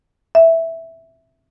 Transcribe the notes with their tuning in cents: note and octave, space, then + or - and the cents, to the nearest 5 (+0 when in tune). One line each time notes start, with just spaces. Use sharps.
E5 -5